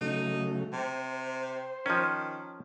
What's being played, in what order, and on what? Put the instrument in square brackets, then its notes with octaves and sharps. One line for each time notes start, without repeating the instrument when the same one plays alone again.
[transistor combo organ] C#3 F#3 A3 [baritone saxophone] D#4
[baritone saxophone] C3 [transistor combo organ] C5
[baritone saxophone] D#3 [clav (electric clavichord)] F3 C#4